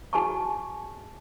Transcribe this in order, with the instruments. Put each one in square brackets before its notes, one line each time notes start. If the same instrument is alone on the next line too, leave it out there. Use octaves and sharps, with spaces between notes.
[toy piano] F#4 G#4 G#5 A5 C#6